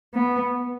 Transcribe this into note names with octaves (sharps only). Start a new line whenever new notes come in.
B3